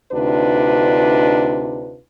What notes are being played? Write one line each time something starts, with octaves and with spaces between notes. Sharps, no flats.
D2 C3 D4 D#4 F4 B4